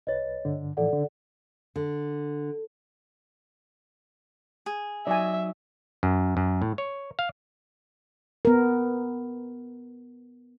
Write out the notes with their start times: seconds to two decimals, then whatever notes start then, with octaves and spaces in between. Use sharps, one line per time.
0.07 C2 B4 C#5 D#5 A6
0.45 G2 D3
0.77 A2 E3 F3 A4 D5 F#5
0.93 D3
1.76 D3
4.66 G#4
5.07 F#3 D#4 D5 E5 G#5
6.03 F#2
6.37 F#2
6.62 A2
6.78 C#5
7.19 F5
8.45 B3 A#4